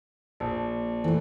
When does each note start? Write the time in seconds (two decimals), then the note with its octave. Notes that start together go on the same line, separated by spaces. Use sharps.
0.40 A#1 A5
1.04 E3 A3 A4 C5